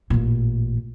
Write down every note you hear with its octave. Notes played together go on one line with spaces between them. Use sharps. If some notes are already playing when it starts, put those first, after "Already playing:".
A1 A#2